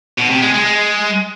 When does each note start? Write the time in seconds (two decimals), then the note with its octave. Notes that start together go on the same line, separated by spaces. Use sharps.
0.18 B2
0.30 C3
0.42 G#3
0.54 G#3
0.66 G#3